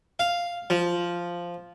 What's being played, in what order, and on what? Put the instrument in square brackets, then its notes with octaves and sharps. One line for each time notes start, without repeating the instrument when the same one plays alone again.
[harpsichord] F5
F3